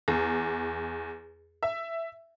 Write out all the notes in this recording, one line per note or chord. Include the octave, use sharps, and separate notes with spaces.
E2
E5